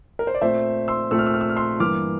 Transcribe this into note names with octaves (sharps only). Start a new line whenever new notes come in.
A#4
C5
D5
A#2 A3 C4 C5 E5
C6 E6
A#2 A3 C4 E6
F6
E6
F6
E6
F6
C6 E6
G2 E3 A#3 D6 F6